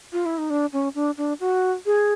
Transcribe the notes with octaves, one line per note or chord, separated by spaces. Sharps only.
F4
E4
D#4
D4
C#4
D4
D4
F#4
G#4